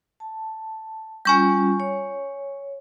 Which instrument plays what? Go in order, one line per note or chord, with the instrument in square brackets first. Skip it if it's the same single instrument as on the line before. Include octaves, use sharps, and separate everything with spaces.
[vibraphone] A5
[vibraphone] G3 C#4 F4 [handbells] G#5 C#6 G6
[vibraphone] C#5